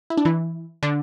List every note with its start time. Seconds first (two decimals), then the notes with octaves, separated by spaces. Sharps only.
0.10 E4
0.17 D4
0.25 E3 E4
0.83 D3 D4